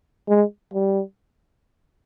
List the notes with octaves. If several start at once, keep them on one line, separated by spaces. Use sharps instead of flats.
G#3
G3